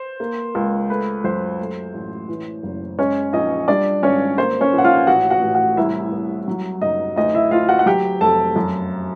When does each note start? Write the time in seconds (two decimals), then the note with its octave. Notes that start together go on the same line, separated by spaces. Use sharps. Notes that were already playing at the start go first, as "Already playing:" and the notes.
Already playing: C5
0.20 A#3
0.55 C#2
0.89 A3 B4
1.24 F#2 C5
1.59 A3
1.94 A1
2.29 E3
2.63 F#1
2.99 G#3 C#4 C#5
3.33 A#1 D#4 D#5
3.68 G3 D4 D5
4.03 G#1 C#4 C#5
4.38 A#3 C5
4.61 C#4 C#5
4.73 A#1
4.78 F#5
4.84 F4 F5
5.07 A1 F#4 F#5
5.30 F#4 F#5
5.43 A1
5.55 F#4 F#5
5.77 C2 E4 E5
6.12 C2
6.48 F#3
6.81 F#1 D#4 D#5
7.16 D2 D#4 D#5
7.34 E4 E5
7.51 D2 F4 F5
7.69 F#4 F#5
7.79 F#5
7.86 F#3 G4 G5
8.21 F1 A4 A5
8.56 F#2